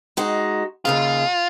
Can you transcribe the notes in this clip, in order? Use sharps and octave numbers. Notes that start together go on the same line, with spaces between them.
G#3 D#4 F#4
D#2 C#3 F4 G#4